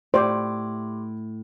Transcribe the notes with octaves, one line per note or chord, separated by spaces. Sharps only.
A2 G4 C5 D5 C6 D6